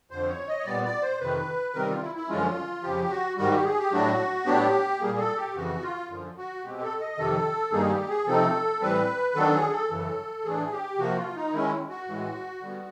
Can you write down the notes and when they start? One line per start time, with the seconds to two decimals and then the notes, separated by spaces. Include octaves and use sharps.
0.11 F2 D3 F3 C5
0.29 C#5
0.47 D#5
0.59 C#5
0.65 A#2 G3 B3 D5
0.84 D5
1.02 C5
1.20 F2 C3 D#3 B4
1.74 C3 D#3 G3 C4 A#4
1.88 F4
2.01 E4
2.15 E4
2.29 F#2 D3 F3 G#3 C#4 F4
2.83 F2 C#3 F3 G4
3.10 F#4
3.37 G#2 D#3 G3 F#4
3.51 G4
3.64 G#4
3.79 G4
3.92 A2 F#3 A3 D4 F#4
4.46 A2 F#3 B3 D4 G4
5.00 A#2 G3 A#3 G#4
5.19 A4
5.37 G4
5.55 F2 C#3 E3 F#4
5.82 F4
6.09 F#2 D3 F3
6.37 F#4
6.63 B2 G#3 C4 G4
6.82 A4
7.00 D#5
7.18 F2 C3 D#3 A4
7.72 G2 D#3 G3 A#3 D#4 G#4
7.90 G4
8.08 G#4
8.26 C3 F3 A3 C4 D#4 A4
8.81 A2 E3 G3 C4 B4
9.35 D#3 F#3 B3 D4 A4
9.53 G#4
9.71 A4
9.90 F#2 C#3 E3
10.45 A2 E3 A3 D4 G#4
10.72 G4
10.98 C3 F3 A#3 F#4
11.16 F4
11.35 D#4
11.52 D#3 G#3 C#4 E4
11.89 F#4
12.07 A2 E3 G#3
12.61 D3 G3 B3